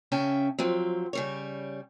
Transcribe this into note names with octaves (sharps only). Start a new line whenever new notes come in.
C#3 C#4 E5 G5 A5
F3 F#3 C4
C#3 G3 C#5